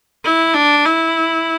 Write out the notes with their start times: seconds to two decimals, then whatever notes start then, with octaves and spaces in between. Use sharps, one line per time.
0.25 E4
0.54 D4
0.85 E4